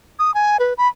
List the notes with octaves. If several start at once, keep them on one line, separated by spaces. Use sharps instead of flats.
D#6
G#5
B4
B5